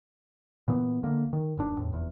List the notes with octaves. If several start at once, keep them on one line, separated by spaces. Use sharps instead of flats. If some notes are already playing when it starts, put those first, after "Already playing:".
A#2 E3 B3
D2 D3 A#3
D#3
D#1 F#2 D4
E2 A2
F1 E2